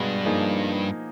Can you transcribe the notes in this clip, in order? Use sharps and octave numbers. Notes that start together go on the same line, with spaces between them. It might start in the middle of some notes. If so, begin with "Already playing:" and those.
Already playing: G2 B2 G#3 B3 D4 G4
F3 A#3 D#4 G#4